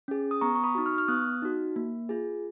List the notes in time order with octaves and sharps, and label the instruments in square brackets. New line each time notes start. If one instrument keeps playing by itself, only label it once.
[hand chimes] C#4 G#4
D#6
B3 A#5 C#6
C#6
B5 D#6
D#4 F#4
C#6 F6
F6
B3 D#6 F#6
D#4 F#4
A#3
F4 G#4